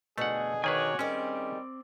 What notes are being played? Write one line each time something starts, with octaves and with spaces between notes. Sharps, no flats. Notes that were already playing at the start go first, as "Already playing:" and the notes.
F2 B2 D3 A3 G#4 F#5
D#3 F#4 G#4 B4 C#5 D5 G#5
D#3 G3 C4 C#4 G#4 D5